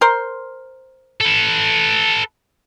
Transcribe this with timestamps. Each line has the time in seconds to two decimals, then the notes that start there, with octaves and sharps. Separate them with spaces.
0.01 A#4 C5 C6
1.21 A4 B4